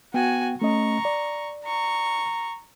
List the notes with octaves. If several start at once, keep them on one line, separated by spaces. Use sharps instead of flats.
B3 F#4 G5 G#5
A3 C#4 D#5 A#5 C#6
D5
A#5 C#6